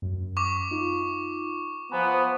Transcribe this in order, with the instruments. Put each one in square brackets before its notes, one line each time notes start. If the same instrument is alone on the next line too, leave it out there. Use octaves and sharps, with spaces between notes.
[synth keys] F#2
[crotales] C#6 D6
[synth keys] D#4 F4
[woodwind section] F3 B3 [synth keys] G#5 A#5
[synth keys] C5